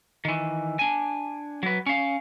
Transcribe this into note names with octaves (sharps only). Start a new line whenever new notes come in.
D#3 E3
D4 G#5
F#3 B4
C#4 F5